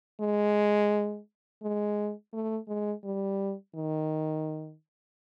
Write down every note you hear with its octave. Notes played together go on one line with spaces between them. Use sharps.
G#3
G#3
A3
G#3
G3
D#3